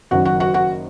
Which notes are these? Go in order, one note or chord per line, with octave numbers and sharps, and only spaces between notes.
F#1 F#2 D#3 F#4 F#5
F#4 F#5
F#4 F#5
F#4 F#5